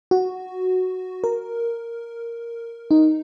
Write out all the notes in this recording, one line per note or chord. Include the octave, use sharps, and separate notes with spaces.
F#4
A#4
D#4